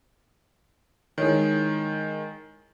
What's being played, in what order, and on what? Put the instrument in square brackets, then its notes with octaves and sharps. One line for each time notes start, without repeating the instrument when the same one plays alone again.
[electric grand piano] D#3 G#3 [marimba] E4 C#5